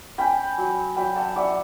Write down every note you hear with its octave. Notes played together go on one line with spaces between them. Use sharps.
C#4 G5 B5
F#3
F#3 G5 B5
F#5 A5
E4 D5 F#5